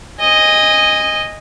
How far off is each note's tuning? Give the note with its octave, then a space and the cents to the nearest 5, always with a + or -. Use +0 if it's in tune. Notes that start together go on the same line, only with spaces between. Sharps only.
D#5 +0 G#5 -20